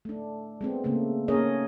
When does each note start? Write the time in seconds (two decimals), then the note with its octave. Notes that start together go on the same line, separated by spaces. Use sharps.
0.05 A3 D4
0.61 G#3 B3 C4
0.84 C#3 A3 A#3 C4
1.28 A#3 C#4 G#4 A#4 C#5 D#5